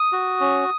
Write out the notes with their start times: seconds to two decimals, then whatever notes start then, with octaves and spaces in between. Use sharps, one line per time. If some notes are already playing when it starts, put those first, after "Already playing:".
Already playing: D#6
0.13 F#4
0.41 C#4